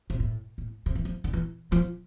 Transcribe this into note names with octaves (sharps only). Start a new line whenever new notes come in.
C3
A2
A2
C3
E3
F3
D3
E3
F3